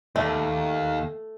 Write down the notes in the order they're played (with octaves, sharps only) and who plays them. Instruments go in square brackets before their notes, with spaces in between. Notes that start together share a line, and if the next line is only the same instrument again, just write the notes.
[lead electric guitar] D#2 [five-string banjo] A3